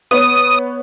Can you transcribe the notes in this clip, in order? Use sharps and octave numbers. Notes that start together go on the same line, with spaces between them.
B3 C#5 D#6